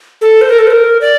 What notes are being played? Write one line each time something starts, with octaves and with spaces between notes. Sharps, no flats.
A4
C5
A#4
A4
C5
A#4
D5